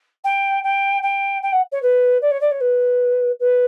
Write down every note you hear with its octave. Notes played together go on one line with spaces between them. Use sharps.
G5
G5
G5
G5
F#5
C#5
B4
D5
C#5
D5
C#5
B4
B4